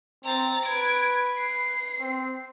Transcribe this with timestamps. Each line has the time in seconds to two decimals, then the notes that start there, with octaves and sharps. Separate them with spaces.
0.24 C4 A#5 A6
0.65 B4 G#6 D7
1.38 C7
2.00 C4